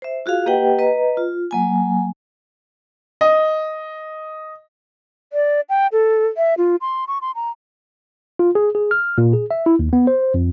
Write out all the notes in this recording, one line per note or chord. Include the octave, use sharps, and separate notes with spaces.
C5 E5
F4 F#4 G#4 F5
A#3 G4 B4 D#5 F#5 G5
B4 D#5 A#5
F4
F#3 A#3 G#5
D#5
D5
G5
A4
E5
F4
C6
C#6
C6
A#5
F4
G#4
G#4
F6
A#2
G#4
E5
E4
D#2
B3
C5
F2